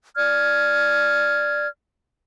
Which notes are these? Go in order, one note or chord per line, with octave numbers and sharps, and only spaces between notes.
D5 F6 G#6